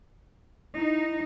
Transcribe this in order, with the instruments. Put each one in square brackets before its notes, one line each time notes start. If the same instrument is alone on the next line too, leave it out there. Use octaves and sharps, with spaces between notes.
[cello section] D#4 [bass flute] E4